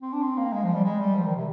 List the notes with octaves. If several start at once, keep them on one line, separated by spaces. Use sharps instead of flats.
C4
D4
C4
A#3
G#3
F3
G3
G#3
G3
F3
D#3
C3